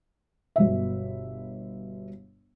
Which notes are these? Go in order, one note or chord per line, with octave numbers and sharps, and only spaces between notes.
G1 B2 E5